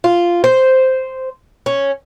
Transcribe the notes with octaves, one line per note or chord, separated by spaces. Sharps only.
F4
C5
C#4